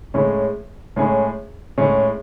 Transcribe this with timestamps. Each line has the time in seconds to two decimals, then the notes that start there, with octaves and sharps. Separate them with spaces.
0.14 A2 G#3 C#4 G#4
0.96 A2 G#3 C#4 G#4
1.78 A2 G#3 C#4 G#4